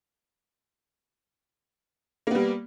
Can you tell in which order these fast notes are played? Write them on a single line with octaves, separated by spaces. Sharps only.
A#3 B3 G3